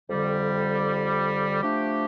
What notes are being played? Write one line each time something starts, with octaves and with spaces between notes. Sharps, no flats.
F2 D3 G3
F3 A3 D4 G4